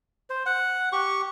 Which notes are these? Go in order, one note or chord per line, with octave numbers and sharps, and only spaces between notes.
C5
F#5
G4 C#6